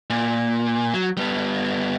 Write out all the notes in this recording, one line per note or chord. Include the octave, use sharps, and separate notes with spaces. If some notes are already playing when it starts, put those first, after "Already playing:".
A#2
F#3
G3 B3